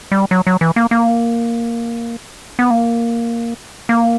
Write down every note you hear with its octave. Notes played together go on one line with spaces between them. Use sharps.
G3
F#3
F#3
E3
A#3
A#3
B3
A#3
A#3